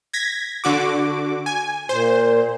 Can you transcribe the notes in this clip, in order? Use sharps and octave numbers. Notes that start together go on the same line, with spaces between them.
G#6 A#6 B6
D3 F#4 D6
G#5
A#2 C5